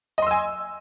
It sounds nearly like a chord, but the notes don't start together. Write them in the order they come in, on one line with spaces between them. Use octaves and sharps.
D#5 C6 E6 G#5